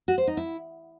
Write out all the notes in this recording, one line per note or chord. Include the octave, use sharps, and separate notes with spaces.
F#4
C5
D#4
E4